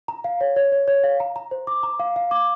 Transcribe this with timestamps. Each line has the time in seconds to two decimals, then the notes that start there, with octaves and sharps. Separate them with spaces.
0.08 A#5
0.24 F5
0.41 C#5
0.56 C#5
0.72 C#5
0.88 C#5
1.04 F5
1.20 A#5
1.36 A#5
1.51 C5
1.67 D6
1.83 A#5
2.00 F5
2.16 F5
2.31 D6